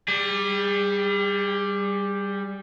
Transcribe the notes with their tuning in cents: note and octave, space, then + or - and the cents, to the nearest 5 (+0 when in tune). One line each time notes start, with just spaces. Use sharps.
G3 +0 G#4 -35